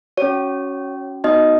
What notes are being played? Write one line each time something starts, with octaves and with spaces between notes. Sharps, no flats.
C#4 F#4 C#5
B3 D#4 F#4 D#5